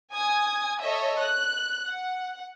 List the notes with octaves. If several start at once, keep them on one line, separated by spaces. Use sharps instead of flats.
G#5 D#6 G#6
A4 C#5 D#5 E5
F#6
F#5